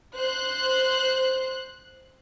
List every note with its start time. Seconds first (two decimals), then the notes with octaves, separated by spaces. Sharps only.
0.16 C5 F#6